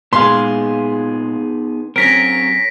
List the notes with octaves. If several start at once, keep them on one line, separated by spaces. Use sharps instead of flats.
A#2 G#3 B3 D#4 G#4 F5 C6
F#3 C4 C#4 A#4 A#6 B6 D7